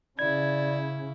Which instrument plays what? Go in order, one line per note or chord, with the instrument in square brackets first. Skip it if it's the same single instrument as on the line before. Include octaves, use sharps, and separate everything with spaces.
[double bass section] C#3 [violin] E4 [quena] D5 [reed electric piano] G#6